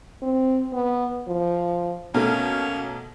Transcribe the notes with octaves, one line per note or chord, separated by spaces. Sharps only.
C4
B3
F3
B2 A3 A#3 C#4